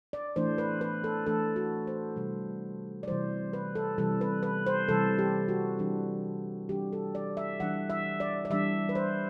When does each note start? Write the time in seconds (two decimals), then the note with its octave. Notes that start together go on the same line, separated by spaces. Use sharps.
0.13 D5
0.36 E3 A3 D4 C5
0.58 B4
0.81 B4
1.04 A4
1.26 E3 A3 D4 A4
1.56 F#4
1.87 C5
2.16 C3 E3 G3
3.03 D5
3.08 C3 E3 G3 C5
3.53 B4
3.75 A4
3.98 C3 E3 G3 A4
4.21 B4
4.43 B4
4.67 C5
4.88 C3 E3 G3 A4
5.19 G4
5.48 F#4
5.79 E3 G3 D4
6.69 E3 G3 D4 G4
6.93 A4
7.15 D5
7.37 E5
7.60 E3 G3 D4 F#5
7.90 E5
8.20 D5
8.45 D5
8.50 E3 G3 D4 E5
8.89 B4
8.95 C5